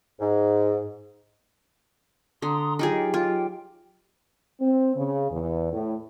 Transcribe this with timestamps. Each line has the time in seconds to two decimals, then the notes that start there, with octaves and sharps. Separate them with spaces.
0.20 G#2
2.42 D3 A#5 C6 D#6
2.79 F#3 D#4 F4 G4 G#4 G5
3.14 F4
4.61 C4
4.96 C#3
5.32 E2
5.73 A2